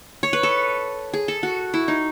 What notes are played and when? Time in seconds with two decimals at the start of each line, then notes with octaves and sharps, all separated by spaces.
0.23 C#5
0.33 B4
0.43 A4
1.14 G#4
1.28 A4
1.43 F#4
1.74 E4
1.88 D#4